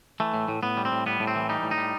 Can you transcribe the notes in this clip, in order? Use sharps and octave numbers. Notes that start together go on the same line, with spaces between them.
E3 A3
A2
A2
A2 B3
G3
C4
A2
G3 B3
A2
C4
E3
G3 D#4
A2
D#4
G3